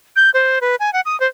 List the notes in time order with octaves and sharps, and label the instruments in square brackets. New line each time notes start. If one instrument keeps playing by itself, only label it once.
[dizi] G6
C5
B4
G#5
F#5
D#6
C5